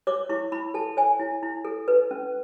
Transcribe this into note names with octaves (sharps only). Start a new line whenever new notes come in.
C#5 D6
E4 C#6
E4 B5
A4 A5
C#5 G#5
E4
E4
A4
B4
C#4